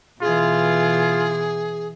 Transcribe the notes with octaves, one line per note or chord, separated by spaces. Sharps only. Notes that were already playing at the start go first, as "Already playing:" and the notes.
B2 E3 F4 G#4